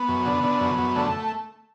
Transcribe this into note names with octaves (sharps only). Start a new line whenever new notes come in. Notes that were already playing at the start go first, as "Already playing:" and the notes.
Already playing: B3
F#2
D3
D3
F#2
F#2
D3 A3